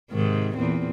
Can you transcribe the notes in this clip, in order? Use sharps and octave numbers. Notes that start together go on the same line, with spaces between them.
G#2 C3 D#3
E2 A#2 C4